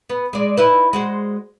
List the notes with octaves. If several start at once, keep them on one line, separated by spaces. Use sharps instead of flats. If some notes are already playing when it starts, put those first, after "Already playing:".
B3
G#3 D5
D#4 E4 B4
G#3 F#4 C5